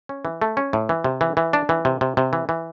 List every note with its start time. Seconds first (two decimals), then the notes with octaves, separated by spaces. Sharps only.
0.09 C#4
0.25 E3
0.42 A3
0.57 C#4
0.73 A2
0.89 E3
1.04 C3
1.21 E3
1.37 E3
1.53 D4
1.69 E3
1.85 C3
2.01 C3
2.17 C3
2.33 E3
2.49 E3